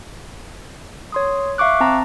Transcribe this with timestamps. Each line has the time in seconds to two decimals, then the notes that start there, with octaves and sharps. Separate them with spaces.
1.12 C#5 C6 D#6
1.58 E5 F5 C#6 D6 F#6
1.80 C4 A5 A#5